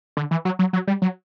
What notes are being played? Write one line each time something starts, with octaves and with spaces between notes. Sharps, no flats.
D3
E3
F#3
F#3
F#3
G3
F#3